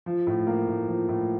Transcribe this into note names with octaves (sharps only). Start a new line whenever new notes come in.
F3
A2
A#3
A2
F3
A2